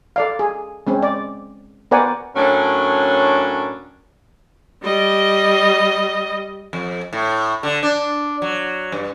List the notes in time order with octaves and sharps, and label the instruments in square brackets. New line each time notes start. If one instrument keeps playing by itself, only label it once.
[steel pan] A4 D5 F5
G#4
G#3 C4 C#4
D5
B3 A#4 C5 D5 F#5 G#5
[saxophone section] A2 F#3 A#3 C#4 D4
[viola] G3 D#5
[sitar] F2
A2
D3
D4
F#3
G2